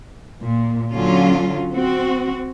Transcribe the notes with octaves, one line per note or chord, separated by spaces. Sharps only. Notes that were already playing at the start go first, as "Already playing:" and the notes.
A#2
D3 F#3 C#4 F4
C4 F#4